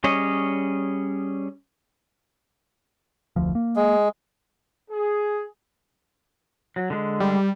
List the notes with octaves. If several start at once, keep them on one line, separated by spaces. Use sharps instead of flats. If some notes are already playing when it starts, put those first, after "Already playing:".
G3 C#4 G#4 C#5 D#5
F1 D2 F3
A#3
G#3
G#4
F#3
D3 G#3
G3